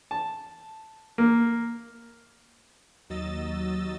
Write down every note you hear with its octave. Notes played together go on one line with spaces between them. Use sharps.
A5
A#3
D#2 F#3 D#5 E6 A6